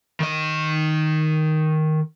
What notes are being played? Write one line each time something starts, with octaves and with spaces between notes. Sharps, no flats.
D#3 D#5